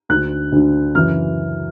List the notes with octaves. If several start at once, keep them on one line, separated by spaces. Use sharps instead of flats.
D2 D3 F#6
D2 D3
F#2 C#3 E3 F6